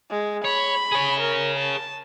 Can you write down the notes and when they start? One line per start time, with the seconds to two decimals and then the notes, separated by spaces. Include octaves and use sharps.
0.10 G#3
0.45 C#5 B5
0.92 G#4 C#5
1.21 A#4
1.59 A5